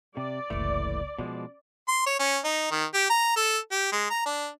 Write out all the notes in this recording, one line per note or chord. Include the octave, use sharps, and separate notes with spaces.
C3 D5
F#1 C2 E3 A3
B2 F3 G#3 C#4
C6
C#5
C#4
D#4
D#3
G4
A#5
A4
G4
G#3
A#5
D4